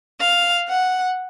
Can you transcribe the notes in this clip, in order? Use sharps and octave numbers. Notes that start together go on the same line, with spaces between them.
F5
F#5